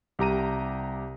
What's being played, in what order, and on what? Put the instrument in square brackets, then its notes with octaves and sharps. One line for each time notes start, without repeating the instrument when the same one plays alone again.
[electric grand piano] C2 G4 A#5 D#7